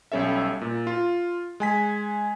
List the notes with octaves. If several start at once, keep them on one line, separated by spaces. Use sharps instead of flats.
B1 G3 C#4 A4 E5
A#2
F4
G#3 G#5 B6